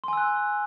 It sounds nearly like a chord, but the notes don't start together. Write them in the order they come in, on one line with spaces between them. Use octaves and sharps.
C6 G#5 E6 F#6